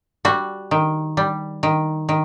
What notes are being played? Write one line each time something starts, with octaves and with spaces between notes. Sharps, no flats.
G3 F#4
D#3
G3
D#3
D#3